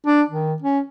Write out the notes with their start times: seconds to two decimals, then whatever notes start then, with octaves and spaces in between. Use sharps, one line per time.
0.06 D4
0.30 D#3
0.62 C#4